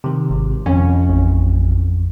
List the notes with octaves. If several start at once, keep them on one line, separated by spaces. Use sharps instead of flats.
C3 D#3
G#1
F2 C#4
A1